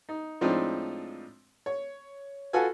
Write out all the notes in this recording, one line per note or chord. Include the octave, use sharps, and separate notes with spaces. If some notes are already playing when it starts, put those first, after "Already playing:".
D#4
A2 F3 G#3 C4 D4 D#4
C#5
F4 F#4 A4 B4 G#5